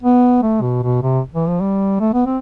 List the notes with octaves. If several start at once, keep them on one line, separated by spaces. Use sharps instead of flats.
B3
A3
B2
B2
C3
E3
F3
G3
A3
B3
C4